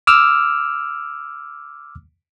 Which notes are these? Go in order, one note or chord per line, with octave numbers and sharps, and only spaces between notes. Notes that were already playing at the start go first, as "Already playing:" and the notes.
D6 E6 F6